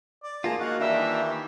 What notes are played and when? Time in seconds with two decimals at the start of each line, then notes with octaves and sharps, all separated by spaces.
0.23 D5
0.44 A#3 F4 G#4 A5 A#5
0.60 D#4 F#4 F5 F#5
0.80 D#3 E3 G3 D4 E5 G5 A#5